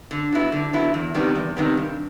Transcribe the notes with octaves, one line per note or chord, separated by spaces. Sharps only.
D3
F#3 B3 E4
D3
F#3 B3 E4
E2
C3 D#3 G3 B3
E2
C3 D#3 G3 B3
G2